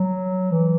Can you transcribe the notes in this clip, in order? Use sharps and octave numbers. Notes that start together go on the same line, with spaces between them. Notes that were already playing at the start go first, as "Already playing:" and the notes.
Already playing: F#3
E3